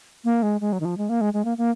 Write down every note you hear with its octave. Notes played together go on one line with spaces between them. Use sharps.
A#3
G#3
G#3
F#3
D#3
F3
G#3
A#3
G#3
G#3
A#3
A#3